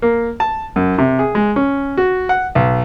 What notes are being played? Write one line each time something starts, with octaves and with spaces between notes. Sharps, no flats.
A#3
A5
F#2
C3
G#4
G#3
C#4
F#4
F#5
B1